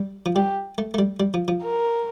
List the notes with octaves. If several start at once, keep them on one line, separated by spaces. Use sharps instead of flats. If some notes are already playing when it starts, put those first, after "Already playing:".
Already playing: G3
F3
G3 G4
A3
A3
G3
G3
F3
F3
A#4